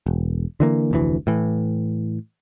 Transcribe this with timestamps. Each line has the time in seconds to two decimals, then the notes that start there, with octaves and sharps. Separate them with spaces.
0.06 E1
0.60 D3 E3 A#3
0.91 F1 D2 E3
1.27 A2 E3